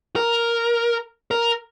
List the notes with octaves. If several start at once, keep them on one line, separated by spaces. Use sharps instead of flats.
A#4
A#4